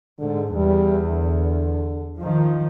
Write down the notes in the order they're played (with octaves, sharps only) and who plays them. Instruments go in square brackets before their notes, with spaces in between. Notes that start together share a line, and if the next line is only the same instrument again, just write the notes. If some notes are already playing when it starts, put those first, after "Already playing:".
[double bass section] G#2 [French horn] D3
[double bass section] E2 [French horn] G3
[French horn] D3
[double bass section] D#3 F3